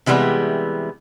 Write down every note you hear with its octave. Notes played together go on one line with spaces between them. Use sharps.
C3 E3 G3 G#3 B3